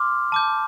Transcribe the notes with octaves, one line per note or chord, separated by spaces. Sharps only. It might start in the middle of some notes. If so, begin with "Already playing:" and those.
Already playing: C6 D6 F6
A5 D6 G6